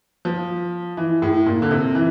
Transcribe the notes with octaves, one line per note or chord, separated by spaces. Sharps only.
F3
E3
A2
A#2
D3
C3
E3